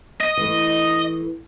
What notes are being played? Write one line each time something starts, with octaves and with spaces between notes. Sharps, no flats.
D#5
E3 A3